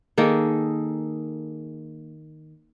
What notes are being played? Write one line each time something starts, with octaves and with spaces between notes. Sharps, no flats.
D#3 A#3 G#4 A4